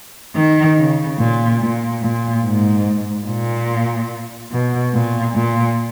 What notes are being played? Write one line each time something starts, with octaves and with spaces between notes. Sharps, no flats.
D#3
C#3
A#2
A#2
A#2
G#2
A#2
B2
A#2
A#2